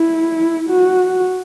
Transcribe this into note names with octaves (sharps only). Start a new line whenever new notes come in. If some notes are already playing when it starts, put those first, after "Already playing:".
Already playing: E4
F#4